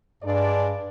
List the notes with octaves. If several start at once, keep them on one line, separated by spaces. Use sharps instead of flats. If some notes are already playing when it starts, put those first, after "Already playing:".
G2 G#3 D4 D5